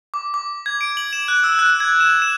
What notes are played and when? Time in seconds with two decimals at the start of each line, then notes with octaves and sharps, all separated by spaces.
0.14 D6
0.34 D6
0.66 G#6
0.81 D7
0.97 F#7
1.13 E7
1.28 F#6
1.44 E6
1.59 F#6
1.80 G#6
2.01 E7
2.22 E7